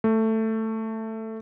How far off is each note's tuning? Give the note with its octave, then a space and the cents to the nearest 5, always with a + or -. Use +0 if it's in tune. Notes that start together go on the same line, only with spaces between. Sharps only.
A3 +10